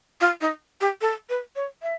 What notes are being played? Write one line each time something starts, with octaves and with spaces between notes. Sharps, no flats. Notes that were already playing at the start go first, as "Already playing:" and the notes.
F4
D#4
G4
A4
B4
C#5
E5